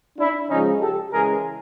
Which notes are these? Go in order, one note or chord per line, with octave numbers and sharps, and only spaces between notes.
D4 E4
C#3 F3 G#3 C#4 D#4
G4 A4
C#3 E3 G#3 G#4 A#4